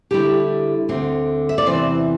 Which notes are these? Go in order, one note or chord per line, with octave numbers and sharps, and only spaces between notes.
D3 G3 E4 G4
D2 D3 C4
E5
D5
E2 C3 E3 C4 C5